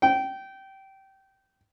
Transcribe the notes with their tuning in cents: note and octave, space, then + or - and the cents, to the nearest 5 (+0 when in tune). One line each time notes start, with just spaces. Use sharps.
G5 -20